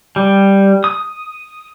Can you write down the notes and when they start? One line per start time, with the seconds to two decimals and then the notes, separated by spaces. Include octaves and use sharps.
0.16 G3
0.84 D#6